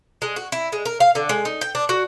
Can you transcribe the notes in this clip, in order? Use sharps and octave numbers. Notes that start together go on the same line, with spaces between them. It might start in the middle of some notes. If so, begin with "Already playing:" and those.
G#3
F#4
E4
G#3
A#4
F5
D3
G#3
D#4
G5
D4
F#4